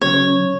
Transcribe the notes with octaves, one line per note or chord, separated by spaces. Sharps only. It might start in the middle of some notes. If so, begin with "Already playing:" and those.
C#3 F#3 C#4 C#5